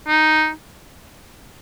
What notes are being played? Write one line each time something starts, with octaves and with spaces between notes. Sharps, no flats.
D#4